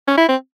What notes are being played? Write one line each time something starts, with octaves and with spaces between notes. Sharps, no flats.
C#4
E4
C4